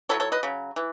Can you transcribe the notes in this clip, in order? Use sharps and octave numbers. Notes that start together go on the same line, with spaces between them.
F#3 B3 E4 A4 C#5
A4 C#5
B4 D#5
C#3 F#3
E3